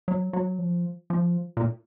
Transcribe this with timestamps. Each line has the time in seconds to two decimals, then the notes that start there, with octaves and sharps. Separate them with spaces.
0.08 F#3
0.33 F#3
0.59 F3
1.10 F3
1.57 A#2